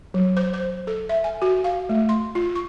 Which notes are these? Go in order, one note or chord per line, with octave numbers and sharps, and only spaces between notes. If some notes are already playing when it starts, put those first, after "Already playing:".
F#3
C5
C5
A4
E5
G#5
F#4
F5
A3
C6
F4
C#6